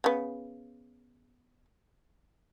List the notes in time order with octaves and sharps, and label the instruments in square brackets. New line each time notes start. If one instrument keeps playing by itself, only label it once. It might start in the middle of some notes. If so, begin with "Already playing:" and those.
[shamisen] C#3 B3